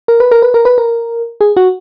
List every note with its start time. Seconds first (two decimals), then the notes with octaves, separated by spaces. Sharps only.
0.08 A#4
0.20 B4
0.31 A#4
0.42 B4
0.54 A#4
0.65 B4
0.78 A#4
1.41 G#4
1.57 F#4